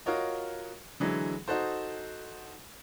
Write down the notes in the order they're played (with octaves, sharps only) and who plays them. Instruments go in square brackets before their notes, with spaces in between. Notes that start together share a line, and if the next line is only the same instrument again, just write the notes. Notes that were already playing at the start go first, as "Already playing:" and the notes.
[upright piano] F4 F#4 A#4 C#5 D#5
D3 E3 F#3 G#3
D#4 F#4 A4 C5